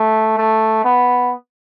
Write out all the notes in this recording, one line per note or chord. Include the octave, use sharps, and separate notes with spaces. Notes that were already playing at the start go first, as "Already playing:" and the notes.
Already playing: A3
A3
B3